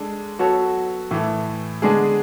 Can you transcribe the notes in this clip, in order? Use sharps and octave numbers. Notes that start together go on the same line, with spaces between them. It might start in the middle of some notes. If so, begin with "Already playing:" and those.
Already playing: G#3 D4 A4
F#3 B3 F#4 A4 C#5
A2 E3 A3
D3 G#3 B3 D4 G#4